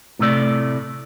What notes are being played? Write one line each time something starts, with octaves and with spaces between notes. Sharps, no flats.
A2 C3 A3 D5